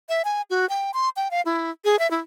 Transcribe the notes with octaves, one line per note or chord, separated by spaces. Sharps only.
E5
G#5
F#4
G5
C6
G5
F5
E4
G#4
E5
E4